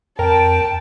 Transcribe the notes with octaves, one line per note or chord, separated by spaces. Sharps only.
F2 A#4 G5 A5